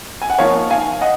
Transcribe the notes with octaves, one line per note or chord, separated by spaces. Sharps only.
G#5
F#5
F3 A#3 D#4 C#5 F5
F5 G#5
D#5 F#5